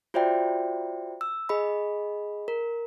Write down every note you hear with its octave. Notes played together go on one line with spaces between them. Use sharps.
F4 F#4 C5 D5 E5 G5
E6
G#4 D#5 B5
A#4